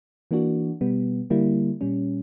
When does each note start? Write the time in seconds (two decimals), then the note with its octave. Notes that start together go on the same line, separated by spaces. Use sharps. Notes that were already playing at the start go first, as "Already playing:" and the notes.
0.31 E3 A#3 D4 F#4
0.81 B2 G3 B3
1.30 D3 G3 A#3 E4
1.81 A#2 G3 C#4